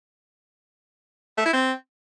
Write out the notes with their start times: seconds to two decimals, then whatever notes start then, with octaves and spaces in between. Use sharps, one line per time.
1.38 A3
1.45 E4
1.53 C4